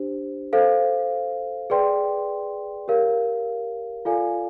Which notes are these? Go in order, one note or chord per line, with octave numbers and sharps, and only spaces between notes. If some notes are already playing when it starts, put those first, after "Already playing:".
Already playing: D4 G4 C5
A4 C5 F5
G#4 B4 D5 G5 C6
G4 A#4 C#5 F5
F4 A4 D5 F5 G#5